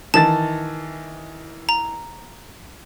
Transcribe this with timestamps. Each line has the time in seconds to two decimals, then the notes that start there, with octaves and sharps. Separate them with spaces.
0.14 D#3 E3 A5 A6
1.69 A#5